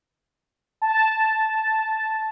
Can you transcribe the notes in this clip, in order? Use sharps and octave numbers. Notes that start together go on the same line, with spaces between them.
A5